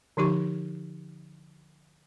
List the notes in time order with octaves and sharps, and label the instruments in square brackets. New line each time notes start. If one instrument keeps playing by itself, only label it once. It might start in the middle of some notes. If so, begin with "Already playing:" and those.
[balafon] D3 F3 D#4 G4 C#6